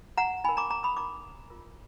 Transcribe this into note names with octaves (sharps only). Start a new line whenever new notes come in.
F#5 A#5
D#4 A#4 G#5 B5
A#5 D6
A#5 D6
B5 D#6
D#4 A#4 A#5 D6
F4 A#4